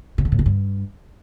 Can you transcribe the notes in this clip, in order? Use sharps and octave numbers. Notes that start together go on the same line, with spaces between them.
C3
D3
A2
C3
G2